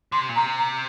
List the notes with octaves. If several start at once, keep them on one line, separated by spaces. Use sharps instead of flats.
D3 C6
C3
A#2
C3 A#5
A#5